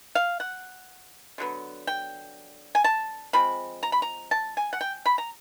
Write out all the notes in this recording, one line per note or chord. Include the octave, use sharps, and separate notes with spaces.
F5
F#5
D3 F#3 B3
G5
G#5
A5
F3 G#3 C4 B5
A#5
B5
A#5
A5
G#5
F#5
G5
B5
A#5